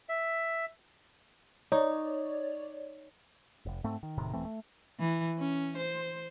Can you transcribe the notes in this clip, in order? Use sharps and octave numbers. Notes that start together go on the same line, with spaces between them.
E5
D#4 C#5 D5
F1
G#2 A3 C4
D#3
E1 A2 C3 D#3
D#1 E3 A3 C4
A3
E3
C#4
C5